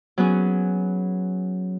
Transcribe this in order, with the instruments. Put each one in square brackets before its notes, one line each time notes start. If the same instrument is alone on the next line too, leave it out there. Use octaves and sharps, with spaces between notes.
[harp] F#3 B3 C#4 G#4